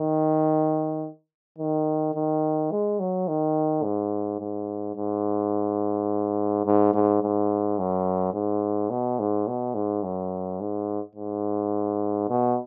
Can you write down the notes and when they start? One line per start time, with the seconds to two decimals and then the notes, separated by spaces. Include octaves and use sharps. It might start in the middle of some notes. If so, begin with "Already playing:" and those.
Already playing: D#3
1.58 D#3
2.14 D#3
2.71 G#3
3.00 F#3
3.28 D#3
3.83 G#2
4.40 G#2
4.96 G#2
6.66 G#2
6.94 G#2
7.22 G#2
7.79 F#2
8.34 G#2
8.90 B2
9.19 G#2
9.48 B2
9.75 G#2
10.03 F#2
10.60 G#2
11.15 G#2
12.29 B2